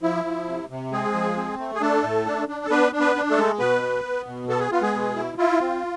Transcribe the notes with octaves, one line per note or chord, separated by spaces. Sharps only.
F3 E4
F3
C3
C3
G#3 C4 G#4
F3
C4
A3
G#4
A3 D4 A4
A2
D4
D4
A4
B3 D4 B4
D4
B3 B4
D4
A3 A4
G#3
B2 B3 B4
B3
B3
B2
B3 A4
G#4
B3 F4
G#3 G#4
B2
E4
E4 F4
C4